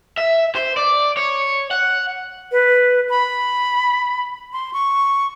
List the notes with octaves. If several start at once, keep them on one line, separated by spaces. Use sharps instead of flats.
E5
C5
D5
C#5
F#5
B4
B5
C6
C#6